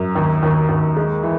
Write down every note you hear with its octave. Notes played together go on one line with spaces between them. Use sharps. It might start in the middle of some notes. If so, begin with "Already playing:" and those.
Already playing: F#2
D#2
D#2
D#2
G#3
E3